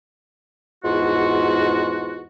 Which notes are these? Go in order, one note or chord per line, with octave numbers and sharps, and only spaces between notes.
E2 G#2 F4 F#4